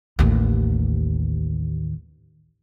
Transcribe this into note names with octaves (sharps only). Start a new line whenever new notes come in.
A1 D#2